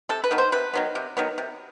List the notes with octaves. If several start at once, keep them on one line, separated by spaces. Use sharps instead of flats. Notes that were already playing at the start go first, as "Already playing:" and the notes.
C3 A4
B4
D#3 F#3 B3
C5
C3 B4
D#3 F#3 B3
C3
D#3 F#3 B3
C3